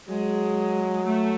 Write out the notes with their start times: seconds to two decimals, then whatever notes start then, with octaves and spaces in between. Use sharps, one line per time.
0.08 F#3 G#3
1.05 A3